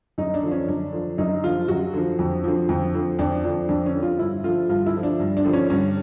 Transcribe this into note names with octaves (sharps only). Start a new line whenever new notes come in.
F#2 D#4
D4
D3 F3
C#4
F#2 D4
D3 F3
F#2 D#4
D3 F3 F4
F#2 F#4
D3 F3
F2
D3 F3
F2
D3 F3
F2 D4
D3 F3 D4
F2 D4
C#4
D3 F3
F4
G2 E4
D3 F3 F4
G2 F4
E4
D3 F3
D4
G2
D4
D3 F3
C#4
G2 C#4